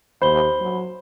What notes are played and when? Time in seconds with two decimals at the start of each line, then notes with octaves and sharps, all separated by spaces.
0.22 D#2 C5 B5 G7
0.60 F#3